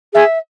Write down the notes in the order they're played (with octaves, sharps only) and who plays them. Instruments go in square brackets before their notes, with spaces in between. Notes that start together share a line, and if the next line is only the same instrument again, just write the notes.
[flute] G#4 [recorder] E5